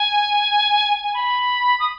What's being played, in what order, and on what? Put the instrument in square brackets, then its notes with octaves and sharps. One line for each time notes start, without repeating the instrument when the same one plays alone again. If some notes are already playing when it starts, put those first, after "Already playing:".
Already playing: [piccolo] G#5
G#5
B5
D#6